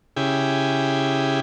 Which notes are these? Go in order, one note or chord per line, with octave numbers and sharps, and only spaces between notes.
C#3 E4 G4 G#4